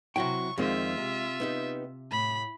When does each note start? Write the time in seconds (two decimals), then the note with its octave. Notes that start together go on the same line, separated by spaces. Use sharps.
0.16 C3 F#3 E4 F#4 G5 C#6
0.58 F2 D#3 G#3 C4 F4 E5
0.98 C3
1.40 B3 D#4 G4
2.12 A2 B5